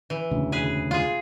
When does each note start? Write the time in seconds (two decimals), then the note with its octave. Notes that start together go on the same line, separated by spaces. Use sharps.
0.10 E3
0.31 E1 D2 C#3
0.52 G#4 B4
0.91 F4 G#4